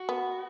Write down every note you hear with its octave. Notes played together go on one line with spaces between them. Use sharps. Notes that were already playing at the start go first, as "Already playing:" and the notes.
Already playing: F#4
B3